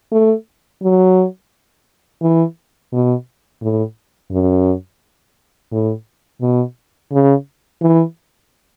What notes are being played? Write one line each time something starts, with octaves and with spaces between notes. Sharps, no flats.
A3
F#3
E3
B2
A2
F#2
A2
B2
C#3
E3